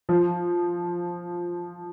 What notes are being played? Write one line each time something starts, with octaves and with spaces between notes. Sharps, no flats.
F3